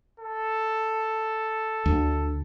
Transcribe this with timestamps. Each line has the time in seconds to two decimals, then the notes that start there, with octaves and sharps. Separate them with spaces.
0.20 A4
1.86 D2